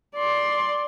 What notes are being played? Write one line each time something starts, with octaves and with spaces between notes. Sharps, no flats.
D5 C6